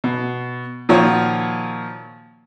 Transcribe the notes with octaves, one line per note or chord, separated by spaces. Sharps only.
B2
A#2 D#3 F3 F#4 C#5